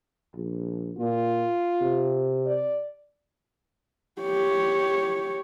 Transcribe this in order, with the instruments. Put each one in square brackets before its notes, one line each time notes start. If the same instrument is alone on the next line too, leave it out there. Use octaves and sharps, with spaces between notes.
[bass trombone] A#1
[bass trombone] A#2 [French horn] F4
[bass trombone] C3
[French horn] D5
[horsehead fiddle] G4 C#5